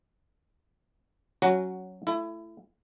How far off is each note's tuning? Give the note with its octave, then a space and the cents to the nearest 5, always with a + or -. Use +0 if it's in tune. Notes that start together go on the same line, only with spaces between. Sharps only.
F#3 +5 C#4 +0 F#4 +0
A3 +0 E4 +25